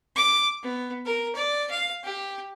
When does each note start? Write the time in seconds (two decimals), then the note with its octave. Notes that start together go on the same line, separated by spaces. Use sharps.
0.15 D6
0.63 B3
1.05 A#4
1.35 D5
1.70 F5
2.03 G4